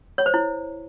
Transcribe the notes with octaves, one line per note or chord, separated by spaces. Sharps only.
C#5
C5
E4